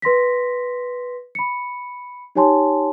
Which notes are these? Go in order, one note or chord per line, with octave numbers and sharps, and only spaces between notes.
B4 C6 A#6 B6
B5 C#7
D#4 G4 C#5 G#5 A5 C6